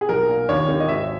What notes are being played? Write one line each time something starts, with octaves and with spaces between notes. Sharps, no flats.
G#4
B1 A#4
A#2
D#2 C#5
D#3
D#5
G#1 E5